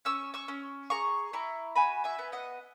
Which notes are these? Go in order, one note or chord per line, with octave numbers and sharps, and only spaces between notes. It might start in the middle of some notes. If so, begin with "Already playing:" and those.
C#4 C#6 E6
C#6 E6
C#4
G#4 A#5 C#6
E4 A#5 C#6
F#4 G#5 B5
E5 G#5
B3
D#5 F#5